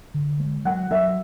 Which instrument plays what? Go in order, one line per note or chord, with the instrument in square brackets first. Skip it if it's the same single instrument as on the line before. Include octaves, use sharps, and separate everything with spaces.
[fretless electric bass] D3
G#3
[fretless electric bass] F#3 [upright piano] F#5
[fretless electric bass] F#3 [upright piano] E5